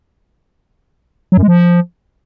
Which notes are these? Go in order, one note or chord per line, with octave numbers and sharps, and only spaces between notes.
F#3
F#2
G#3
F3